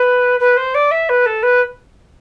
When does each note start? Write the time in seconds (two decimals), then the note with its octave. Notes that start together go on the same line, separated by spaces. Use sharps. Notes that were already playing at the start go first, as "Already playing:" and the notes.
Already playing: B4
0.40 B4
0.57 C5
0.75 D5
0.91 E5
1.09 B4
1.26 A4
1.43 B4